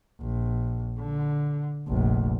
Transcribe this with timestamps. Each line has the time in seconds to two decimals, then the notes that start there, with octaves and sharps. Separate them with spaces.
0.21 A#1
0.99 D3
1.88 F1 A#1